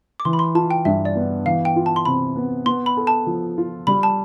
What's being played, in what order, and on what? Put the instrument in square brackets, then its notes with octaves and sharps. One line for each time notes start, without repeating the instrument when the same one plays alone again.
[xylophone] D6
[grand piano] E3 [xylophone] C6
[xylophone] B5
C6
[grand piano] F4 [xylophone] A5
[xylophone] G5
[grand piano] G2 [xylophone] E5
[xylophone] D5
[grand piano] B3
[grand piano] E3 [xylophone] F5
[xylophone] G5
[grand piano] F4
[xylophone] A5
C6
[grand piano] C3 [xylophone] B5
[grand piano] B3
[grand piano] B3 [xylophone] C6
[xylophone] B5
[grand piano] A4
[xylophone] A5
[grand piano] F3
F4
[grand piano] G3 [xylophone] B5
[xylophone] A5